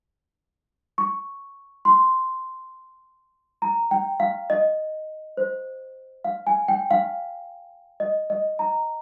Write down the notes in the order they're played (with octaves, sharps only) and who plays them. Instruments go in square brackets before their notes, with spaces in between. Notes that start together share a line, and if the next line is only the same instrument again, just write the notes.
[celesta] C#6
C6
A#5
G5
F5
D#5
C5
F5
G#5
G5
F5
D#5
D#5
A#5